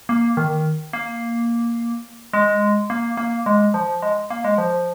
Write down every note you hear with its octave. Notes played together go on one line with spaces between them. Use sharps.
A#3
D#3
A#3
G#3
A#3
A#3
G#3
F3
G#3
A#3
G#3
F3